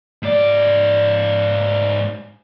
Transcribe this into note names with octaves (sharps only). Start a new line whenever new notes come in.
G#2 D5